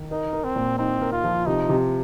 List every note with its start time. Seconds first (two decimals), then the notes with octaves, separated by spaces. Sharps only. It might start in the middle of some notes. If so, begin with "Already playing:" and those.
Already playing: D#3
0.11 D#4 A#4
0.33 A#4
0.44 C4
0.56 A#2
0.78 C4 D#4
1.02 A#4
1.13 F4
1.24 F3
1.46 C3 D#4
1.69 C3